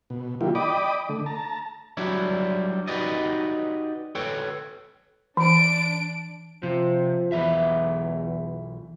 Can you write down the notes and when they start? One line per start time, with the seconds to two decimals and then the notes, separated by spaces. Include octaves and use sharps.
0.10 B2
0.41 D#3 F#3 A#3 E4 F4 G4
0.55 D5 D#5 G5 B5 D6 D#6
1.09 D3 A3
1.26 A5 A#5
1.97 F#3 G3 D4 E4 C#5
2.88 D#4 F#4 G4 B4 D5 D#5
4.15 A4 B4 C#5 G5
5.37 E3 D4 D7
6.63 C3 F3
7.32 B1 E2 E3 E5